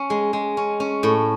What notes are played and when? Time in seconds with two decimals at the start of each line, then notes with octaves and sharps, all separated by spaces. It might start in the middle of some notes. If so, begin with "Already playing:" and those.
Already playing: C#4
0.10 G#3
0.33 G#3
0.57 C#4
0.80 C#4
1.03 A2